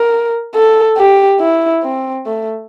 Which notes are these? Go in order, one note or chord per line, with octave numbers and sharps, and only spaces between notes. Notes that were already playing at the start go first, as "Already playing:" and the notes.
Already playing: A#4
A4
G4
E4
C4
A3